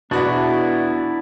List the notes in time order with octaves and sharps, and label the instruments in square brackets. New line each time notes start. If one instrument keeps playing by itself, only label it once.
[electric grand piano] E2 F#4 D5 [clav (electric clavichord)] B2 [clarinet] B3 [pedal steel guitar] D4 E4